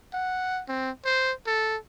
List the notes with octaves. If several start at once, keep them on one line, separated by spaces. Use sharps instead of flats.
F#5
C4
C5
A4